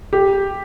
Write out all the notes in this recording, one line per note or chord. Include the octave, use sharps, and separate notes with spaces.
G4